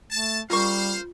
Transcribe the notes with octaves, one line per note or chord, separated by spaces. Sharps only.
A3 A5
C#3 G3 A#3 F4 C5 F5 C#6